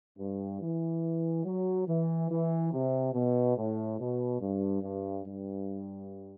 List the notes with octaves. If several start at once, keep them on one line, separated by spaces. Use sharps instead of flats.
G2
E3
F#3
E3
E3
C3
B2
A2
B2
G2
G2
G2